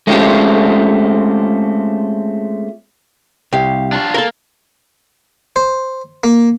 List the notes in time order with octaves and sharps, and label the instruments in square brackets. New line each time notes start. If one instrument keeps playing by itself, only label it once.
[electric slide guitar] G#3 A3 C4 C#4 F4 G4
[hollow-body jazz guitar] C2 [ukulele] G4 F5
[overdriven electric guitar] D4 F4
[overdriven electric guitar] A#3 [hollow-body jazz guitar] A4 A#4
[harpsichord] C5
A#3